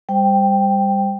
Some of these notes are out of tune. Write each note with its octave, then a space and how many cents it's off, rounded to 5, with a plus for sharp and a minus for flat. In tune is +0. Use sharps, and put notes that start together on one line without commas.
G3 +25 C5 -5 G5 +0